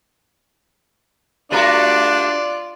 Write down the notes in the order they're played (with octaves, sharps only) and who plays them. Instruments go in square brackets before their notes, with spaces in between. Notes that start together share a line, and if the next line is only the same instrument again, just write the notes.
[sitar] G3 A3 F#4 [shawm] D4 [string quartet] F4 [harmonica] D5